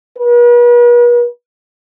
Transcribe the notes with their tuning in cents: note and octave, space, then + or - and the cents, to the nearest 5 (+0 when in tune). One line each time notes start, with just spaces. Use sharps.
B4 -45